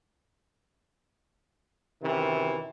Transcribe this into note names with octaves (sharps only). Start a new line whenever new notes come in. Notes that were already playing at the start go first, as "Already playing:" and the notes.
F#2 C3 D#3 E3